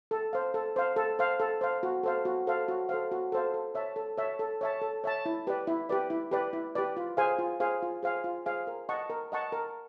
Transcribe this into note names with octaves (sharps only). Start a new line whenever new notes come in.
A4
C5 F5
A4
C5 F5
A4
C5 F5
A4
C5 F5
F#4
A4 C5 F5
F#4
A4 C5 F5
F#4
A4 C5 F5
F#4
A4 C5 F5
A4
C#5 E5 A5
A4
C#5 E5 A5
A4
C#5 E5 A5
A4
C#5 E5 A5
E4
G4 B4 D5
E4
G4 B4 D5
E4
G4 B4 D5
E4
G4 B4 D5
F4
G#4 C5 F5 G#5
F4
G#4 C5 F5 G#5
F4
G#4 C5 F5 G#5
F4
G#4 C5 F5 G#5
A#4
D#5 F#5 A5 C#6
A#4
D#5 F#5 A5 C#6
A#4